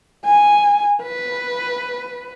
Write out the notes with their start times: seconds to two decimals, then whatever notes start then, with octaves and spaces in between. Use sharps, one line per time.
0.25 G#5
1.03 B4